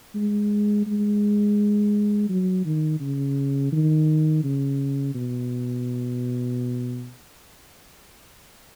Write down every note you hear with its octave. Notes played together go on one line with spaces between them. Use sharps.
G#3
G#3
F#3
D#3
C#3
D#3
C#3
B2